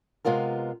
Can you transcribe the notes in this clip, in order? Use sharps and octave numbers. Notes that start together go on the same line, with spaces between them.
C3 G#3 B3 F4 A#4